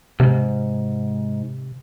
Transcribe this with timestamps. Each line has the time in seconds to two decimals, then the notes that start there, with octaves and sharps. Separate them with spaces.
0.20 C#2 G#2 C3